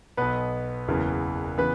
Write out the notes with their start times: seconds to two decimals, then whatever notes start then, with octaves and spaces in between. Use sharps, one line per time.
0.17 B1 B2 B3 B4
0.88 F#1 E2 C#3 E3
1.58 C#3 E3 B3 B4